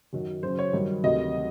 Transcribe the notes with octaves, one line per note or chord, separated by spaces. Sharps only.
F#2 D#3 F#3
F#2 C#3 F#3 C5
C#5
G2 D#3 F#3
D2 C3 D#3 F#3 D#5